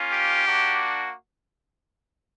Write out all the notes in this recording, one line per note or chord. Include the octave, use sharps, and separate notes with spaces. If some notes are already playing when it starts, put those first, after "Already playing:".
Already playing: A#3 C#4 F4
G4
A#3 D4 F#4